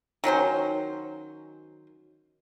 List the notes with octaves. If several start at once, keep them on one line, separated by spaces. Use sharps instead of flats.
D#3 F#3 C#4 C5